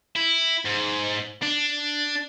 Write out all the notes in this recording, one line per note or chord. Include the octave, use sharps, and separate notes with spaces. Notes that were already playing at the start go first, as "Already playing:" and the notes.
E4
G#2
D4